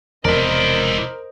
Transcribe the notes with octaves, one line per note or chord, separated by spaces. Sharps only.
E1 C3 F3 E4 A#4 C5 D5 D#5